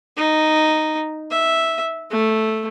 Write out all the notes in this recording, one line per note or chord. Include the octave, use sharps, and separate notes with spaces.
D#4
E5
A3